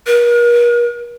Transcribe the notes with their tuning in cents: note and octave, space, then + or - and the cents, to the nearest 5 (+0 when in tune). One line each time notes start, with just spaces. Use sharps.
A#4 +45